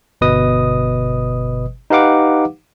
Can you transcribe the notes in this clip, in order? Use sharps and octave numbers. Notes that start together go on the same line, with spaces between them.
G1 B2 B4 D#5 D#6
D#4 G4 B4 F5 F#5 D6